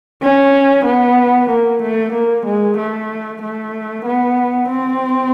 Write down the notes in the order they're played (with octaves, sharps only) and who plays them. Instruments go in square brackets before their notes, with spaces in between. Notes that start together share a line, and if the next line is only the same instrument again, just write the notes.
[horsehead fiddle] C#4
B3
A#3
A3
A#3
G#3
A3
A3
B3
C4